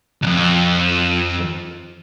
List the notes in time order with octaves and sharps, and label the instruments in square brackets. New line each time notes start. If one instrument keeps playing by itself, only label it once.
[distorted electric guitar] B1 F2